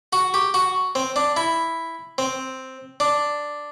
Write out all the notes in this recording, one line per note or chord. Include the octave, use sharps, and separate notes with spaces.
F#4
G4
F#4
C4
D4
E4
C4
D4